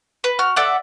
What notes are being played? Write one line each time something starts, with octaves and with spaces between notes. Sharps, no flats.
B4
F#4 F6
A4 D5 E5 F#5